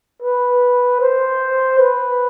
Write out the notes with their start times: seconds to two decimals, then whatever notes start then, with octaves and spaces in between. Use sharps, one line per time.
0.22 B4
1.01 C5
1.79 B4